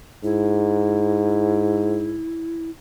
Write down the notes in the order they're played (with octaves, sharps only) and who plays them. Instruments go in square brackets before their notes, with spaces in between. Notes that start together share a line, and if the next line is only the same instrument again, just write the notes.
[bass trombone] G#2 [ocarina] E4